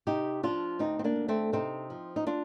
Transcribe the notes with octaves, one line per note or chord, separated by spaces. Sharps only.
C3 D#4 G4
F3 D4 F4
D2 C4 D#4
C4
A#3 D4
D2
A3 C4
C3 C4 D#4
F3
D#4
D4 F4